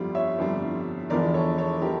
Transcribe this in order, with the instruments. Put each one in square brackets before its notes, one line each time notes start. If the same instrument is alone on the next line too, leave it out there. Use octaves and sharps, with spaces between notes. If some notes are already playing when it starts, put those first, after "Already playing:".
Already playing: [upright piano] G1 F2 D3 G3 F4
C#5 E5
G1 F2 D3 G3
E1 E2 D3 F3 A#4 D5
A4 C#5
A4 C#5
D3 F3 G4 A#4